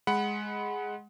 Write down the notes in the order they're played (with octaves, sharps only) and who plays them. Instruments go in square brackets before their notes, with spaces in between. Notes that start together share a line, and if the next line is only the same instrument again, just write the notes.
[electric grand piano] G#3 F#5 B5